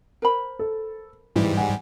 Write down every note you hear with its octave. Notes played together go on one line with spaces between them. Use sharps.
A#4 C5 B5
A4
G#2 E3 G3
F#5 G#5